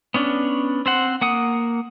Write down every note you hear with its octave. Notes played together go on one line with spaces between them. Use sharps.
B3 C#4 D4
C4 C5 F#5
A#3 F#5 D#6